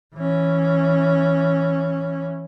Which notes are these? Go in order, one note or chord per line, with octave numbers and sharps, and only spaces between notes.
E3 C#4